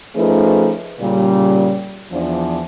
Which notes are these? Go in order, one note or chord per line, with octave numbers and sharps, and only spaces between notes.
F3 A3 C#4 D#4 G#4 B4
A#2 C#3 G3
E2 F3 D4